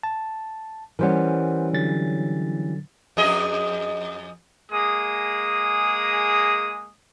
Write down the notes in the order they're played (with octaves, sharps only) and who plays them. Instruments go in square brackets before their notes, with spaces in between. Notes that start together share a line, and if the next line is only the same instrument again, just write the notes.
[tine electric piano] A5
[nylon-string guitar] E3 G3 C#4 [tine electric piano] A#4 C5 F#5
[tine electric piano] D3 F#3 A6
[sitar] F2 G#4 D#5
[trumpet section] G#3 A#3 G#4 D#6